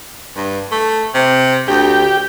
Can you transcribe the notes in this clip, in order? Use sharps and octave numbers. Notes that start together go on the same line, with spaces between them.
G2
A3
C3
D2 G4